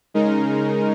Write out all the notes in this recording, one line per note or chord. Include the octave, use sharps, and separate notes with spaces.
C#3 G#3 D#4 A#4